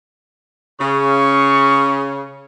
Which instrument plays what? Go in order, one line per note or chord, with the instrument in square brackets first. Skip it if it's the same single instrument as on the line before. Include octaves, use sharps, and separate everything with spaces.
[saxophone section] C#3 [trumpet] C#6